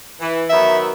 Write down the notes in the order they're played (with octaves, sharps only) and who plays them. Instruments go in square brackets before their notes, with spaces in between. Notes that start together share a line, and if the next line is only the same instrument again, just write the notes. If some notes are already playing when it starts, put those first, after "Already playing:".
[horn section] E3
[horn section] D#3 F#3 B3 [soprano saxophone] E5